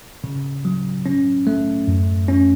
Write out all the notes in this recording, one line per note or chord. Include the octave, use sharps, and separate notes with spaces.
C#3
F#3
C#4
A3
F#2
C#4